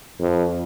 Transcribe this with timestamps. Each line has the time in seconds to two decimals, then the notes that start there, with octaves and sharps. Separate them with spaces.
0.20 F2